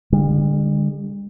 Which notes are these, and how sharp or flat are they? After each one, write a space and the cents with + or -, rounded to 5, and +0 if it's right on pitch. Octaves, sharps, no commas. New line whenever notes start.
D3 +0 G3 +45